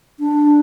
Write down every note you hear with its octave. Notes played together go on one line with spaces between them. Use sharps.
D4